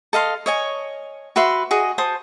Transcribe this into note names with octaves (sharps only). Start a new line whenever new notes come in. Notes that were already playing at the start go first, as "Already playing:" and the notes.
A4 D#5 F5 C6
C#5 D#5 G#5
F#4 B4 E5 C6
F#4 G#4 D#5
F#4 C5 A5 D#6